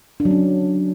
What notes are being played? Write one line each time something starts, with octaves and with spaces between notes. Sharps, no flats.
D4
F#3
C#4